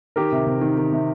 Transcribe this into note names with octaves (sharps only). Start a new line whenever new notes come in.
D#3 G4 A#4
C3
C3
D#3
D#3
C3